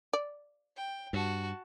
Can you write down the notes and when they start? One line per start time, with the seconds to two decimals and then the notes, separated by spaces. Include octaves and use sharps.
0.13 D5
0.77 G5
1.13 G2 F#4 A5